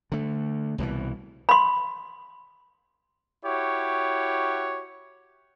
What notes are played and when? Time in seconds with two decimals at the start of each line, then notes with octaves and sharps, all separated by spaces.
0.12 D3 A3
0.78 C2 B2 D#3 E3
1.49 B5 C6
3.44 E4 F#4 G4 C#5